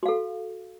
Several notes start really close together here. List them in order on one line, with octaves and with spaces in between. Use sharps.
F#4 F5 A4